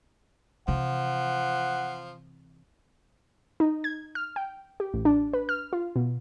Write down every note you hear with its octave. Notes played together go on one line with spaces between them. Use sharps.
C3 E3 F3 F#5
D#4
G#6
F6
G5
G4
A1
D4
B4
F6
F4
B2